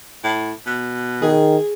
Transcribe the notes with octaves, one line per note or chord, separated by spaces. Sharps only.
A2
B2
D#3 G#4